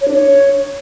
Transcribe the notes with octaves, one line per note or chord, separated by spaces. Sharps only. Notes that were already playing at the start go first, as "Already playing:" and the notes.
C#5
D4
C#5